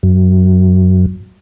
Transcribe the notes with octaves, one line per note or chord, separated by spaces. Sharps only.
F#2